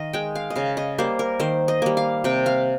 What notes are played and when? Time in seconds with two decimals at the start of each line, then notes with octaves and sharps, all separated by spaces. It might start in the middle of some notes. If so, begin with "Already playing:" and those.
Already playing: D#3 D#5 F5
0.13 G#3 G5
0.35 F5
0.50 D#5
0.55 C#3 F5
0.77 D#5
0.98 G3 A#3 C5
1.19 A#4
1.40 D#3 C5
1.68 D#5
1.82 G3 A#3
1.97 F5
2.24 C3 G5
2.46 F5